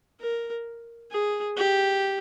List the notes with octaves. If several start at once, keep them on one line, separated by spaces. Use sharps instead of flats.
A#4
G#4
G4